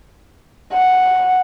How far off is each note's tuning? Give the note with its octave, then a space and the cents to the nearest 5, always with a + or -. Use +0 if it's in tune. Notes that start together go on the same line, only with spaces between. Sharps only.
F#5 -5